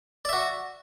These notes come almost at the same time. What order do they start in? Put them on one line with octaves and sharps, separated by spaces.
D5 E5 F#4